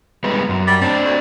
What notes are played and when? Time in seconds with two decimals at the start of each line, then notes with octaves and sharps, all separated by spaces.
0.24 G3 G#3 B3
0.49 F#2
0.67 G3
0.82 G3 C4 D4
1.04 D2